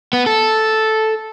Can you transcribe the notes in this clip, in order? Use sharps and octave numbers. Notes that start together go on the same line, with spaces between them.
B3
A4